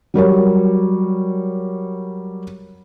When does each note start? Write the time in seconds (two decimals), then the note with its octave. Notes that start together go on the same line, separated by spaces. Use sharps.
0.14 F#3 G3 A#4 C#5